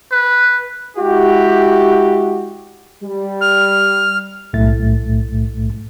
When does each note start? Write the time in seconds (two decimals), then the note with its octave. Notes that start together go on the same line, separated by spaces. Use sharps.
0.12 B4
0.97 G#3 E4 F#4 G4
3.03 G3
3.41 F6
4.53 B1 A2 A3 A6